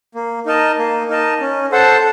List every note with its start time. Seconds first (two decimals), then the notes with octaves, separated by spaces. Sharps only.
0.15 A#3
0.46 D#4 A#4 D#5 A5
0.78 A#3
1.08 D#4 A#4 D#5 A5
1.41 C#4
1.72 A4 C5 F#5 A5